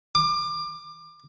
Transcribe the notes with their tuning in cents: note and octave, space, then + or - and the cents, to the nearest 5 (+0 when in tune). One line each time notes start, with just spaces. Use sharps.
D6 +25